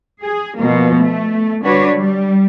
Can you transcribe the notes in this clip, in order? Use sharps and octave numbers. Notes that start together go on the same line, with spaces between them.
G#4
B2 F3 A#3
A3
D3 G3 D4 F#4 B4 C#5
G3